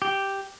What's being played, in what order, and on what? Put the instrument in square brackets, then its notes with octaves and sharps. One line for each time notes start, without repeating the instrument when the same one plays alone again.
[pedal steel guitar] G4